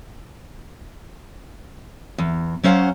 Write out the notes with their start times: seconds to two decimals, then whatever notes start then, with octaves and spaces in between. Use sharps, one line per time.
2.18 E2
2.63 F#3 C#4 C5 D5 F5 F#5